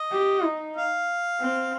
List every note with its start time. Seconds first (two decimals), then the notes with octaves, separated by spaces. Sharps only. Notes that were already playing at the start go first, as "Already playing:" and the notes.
Already playing: D#5
0.11 G4
0.44 D#4
0.76 F5
1.40 C4